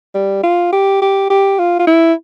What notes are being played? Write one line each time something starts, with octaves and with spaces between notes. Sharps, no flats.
G3
F4
G4
G4
G4
F4
F4
E4